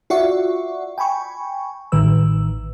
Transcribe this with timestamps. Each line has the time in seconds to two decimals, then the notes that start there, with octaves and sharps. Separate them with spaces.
0.10 F4 F#4 D5 E5 F#5 C#6
0.98 G5 G#5 B5 C#6
1.92 A1 A2 D#3 B4 E6